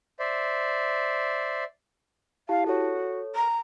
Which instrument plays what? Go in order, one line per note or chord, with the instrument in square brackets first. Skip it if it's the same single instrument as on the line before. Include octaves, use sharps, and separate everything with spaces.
[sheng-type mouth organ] C5 D5 E5
[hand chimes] E4 G4 A5 [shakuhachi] F5
[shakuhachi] F#4 [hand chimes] A4 C#5
[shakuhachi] A#5